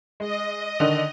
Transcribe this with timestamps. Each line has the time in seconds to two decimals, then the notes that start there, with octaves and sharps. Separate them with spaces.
0.20 G#3 D#5
0.80 D3 D#3 D4